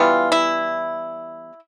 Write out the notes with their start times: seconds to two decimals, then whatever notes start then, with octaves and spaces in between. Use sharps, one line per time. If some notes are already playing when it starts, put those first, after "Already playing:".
Already playing: E3 G3 B3 F4
0.32 E4